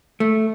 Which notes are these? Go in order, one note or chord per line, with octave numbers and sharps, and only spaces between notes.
A3